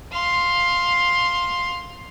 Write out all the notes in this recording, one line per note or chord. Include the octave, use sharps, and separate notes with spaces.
F5 C6